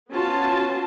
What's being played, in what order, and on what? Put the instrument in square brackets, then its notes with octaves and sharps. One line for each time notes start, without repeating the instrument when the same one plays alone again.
[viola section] B3 C#4 F4 F#4 A5